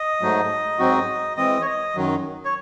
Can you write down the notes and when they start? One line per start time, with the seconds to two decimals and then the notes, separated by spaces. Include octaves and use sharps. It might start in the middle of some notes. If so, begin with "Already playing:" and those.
Already playing: D#5
0.21 G#2 F#3 A3 D#4
0.79 G#2 F#3 C4 D#4 F#4
1.37 E3 G#3 C4 D#5
1.62 C#5
1.66 D#5
1.95 F#2 D#3 F#3
2.45 C#5